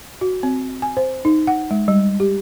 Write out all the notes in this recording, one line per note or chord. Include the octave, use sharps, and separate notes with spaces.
F#4
C4
G#5
C5
D#4
F#5
G#3
G3
G4